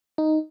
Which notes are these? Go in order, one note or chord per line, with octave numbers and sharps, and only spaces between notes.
D#4